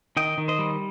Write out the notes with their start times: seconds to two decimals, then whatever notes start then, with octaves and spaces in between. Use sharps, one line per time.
0.17 D#3 D#5 G5
0.38 D#3
0.48 C5 D#5
0.59 G3